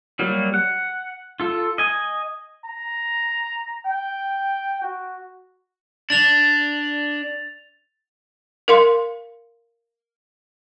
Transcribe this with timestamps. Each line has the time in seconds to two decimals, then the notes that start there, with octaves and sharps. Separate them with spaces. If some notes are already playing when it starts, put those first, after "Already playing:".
0.19 F#3 G3 A#3
0.54 F#5
1.40 F4 A4
1.78 D#5 G#5
2.65 A#5
3.86 G5
4.82 F#4
6.10 D4 A6 F7
8.68 A#4 F5 C6